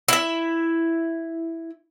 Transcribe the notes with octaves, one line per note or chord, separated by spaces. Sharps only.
E4 E5